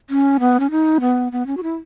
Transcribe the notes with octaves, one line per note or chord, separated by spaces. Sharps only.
C#4
B3
C#4
D#4
B3
B3
C#4
F#4
E4